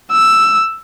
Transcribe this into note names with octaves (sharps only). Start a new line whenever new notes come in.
E6